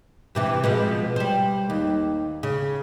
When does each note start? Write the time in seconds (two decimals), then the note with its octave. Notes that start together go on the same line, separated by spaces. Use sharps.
0.35 G2 C3 E3
0.64 B2 F3 G#3
1.16 G3 C5
1.70 D#2
2.43 C#3